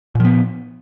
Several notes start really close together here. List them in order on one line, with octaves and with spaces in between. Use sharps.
A#2 F3 B3